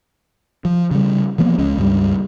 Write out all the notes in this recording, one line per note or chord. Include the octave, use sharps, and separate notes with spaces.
F3
C#3 G3
E3 F3 A#3 B3
C#2 G#3 C#4
C#2 G2 G3